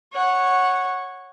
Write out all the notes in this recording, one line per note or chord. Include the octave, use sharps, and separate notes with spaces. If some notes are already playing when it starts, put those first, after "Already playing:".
C#5 F#5